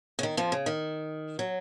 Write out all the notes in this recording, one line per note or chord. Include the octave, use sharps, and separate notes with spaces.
C#3
D#3
F2 F3
C#3
D#3
F#3